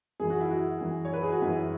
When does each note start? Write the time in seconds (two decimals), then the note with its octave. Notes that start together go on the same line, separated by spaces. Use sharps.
0.20 F#2 E3 G#4
0.30 F#4
0.40 E4
0.51 F#4
0.81 F#2 E3
1.05 C#5
1.13 B4
1.23 G#4
1.32 F#4
1.41 F#2 E3 E4